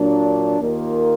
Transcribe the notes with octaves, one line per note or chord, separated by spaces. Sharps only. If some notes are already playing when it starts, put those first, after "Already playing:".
Already playing: A#2 F#3 D4
D#2 D#3 A#3 F4